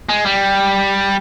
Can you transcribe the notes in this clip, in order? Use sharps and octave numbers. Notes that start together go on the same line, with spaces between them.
G#3
G3